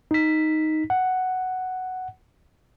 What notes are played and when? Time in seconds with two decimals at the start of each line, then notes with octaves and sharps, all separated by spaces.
0.11 D#4 B6
0.90 F#5